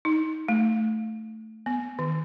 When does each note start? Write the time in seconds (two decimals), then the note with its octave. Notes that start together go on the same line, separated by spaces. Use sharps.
0.05 D#4
0.48 A3
1.66 B3
1.99 D#3